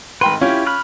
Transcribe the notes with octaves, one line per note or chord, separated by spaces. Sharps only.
G#1 B4 G5 C6
C#4 E4 F4 G4
B5 F6 F#6